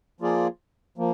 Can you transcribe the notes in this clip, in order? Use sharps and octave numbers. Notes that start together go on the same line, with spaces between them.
F3 A#3 F4 G#4 D5
F3 A#3